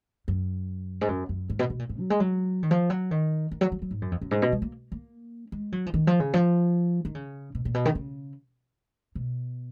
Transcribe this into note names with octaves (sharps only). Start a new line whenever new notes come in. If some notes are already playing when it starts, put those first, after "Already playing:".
F#2
G#2
F#2
F#2
G#2
B2
B2
A#2
G#2
F#3
G#3
F#3
D#3
F3
F#3
D#3
D#3
F#3
F#3
F#3
G#2
F#2
F2
F#2
G#2
B2
G#3
A#3
A#3
G#3
F#3
F3
D#3
F3
C#3
F3
D#3
C#3
B2
A#2
B2
D#3
C#3
B2